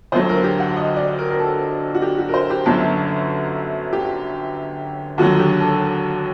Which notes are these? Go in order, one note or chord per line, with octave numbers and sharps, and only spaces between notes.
D2 D3 F#3 C5
A#4
G4
F#5
D#5
D5
A#4
A#4
A4
F#4
G4
F#4
A#4
C5
G4
G1 F#2 D3 F#3 A4
G4
D#2 D3 F#3 F#4
G4
A4